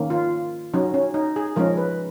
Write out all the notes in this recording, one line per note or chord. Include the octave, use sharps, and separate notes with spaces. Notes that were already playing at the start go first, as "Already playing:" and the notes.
Already playing: D#3 A#3 C#4
F4
F#3 C#4 D#4
C#4
D#4
G#4
F3 G#3 C#4 A#4
B4